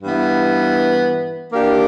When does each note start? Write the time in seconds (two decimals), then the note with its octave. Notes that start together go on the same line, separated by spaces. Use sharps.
0.02 G2 E3 B3
1.50 E3 A#3 D4 G4